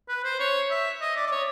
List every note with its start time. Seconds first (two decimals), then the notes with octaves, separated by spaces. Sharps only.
0.09 B4
0.24 C5
0.39 C#5
0.71 E5
1.01 D#5
1.17 D5
1.27 D5
1.32 C#5